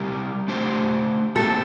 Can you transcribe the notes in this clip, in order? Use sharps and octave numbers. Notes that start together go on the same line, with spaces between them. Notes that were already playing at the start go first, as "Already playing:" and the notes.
Already playing: C3 G3 C4 G4 A#4
A3 D4 G4 C5
A#2 A3 C4 G4 A4